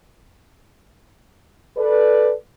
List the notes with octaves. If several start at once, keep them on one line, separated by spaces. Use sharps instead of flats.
A4 B4 D5